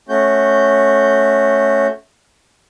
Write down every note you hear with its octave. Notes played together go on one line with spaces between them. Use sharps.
A3 C#4 F#4 G6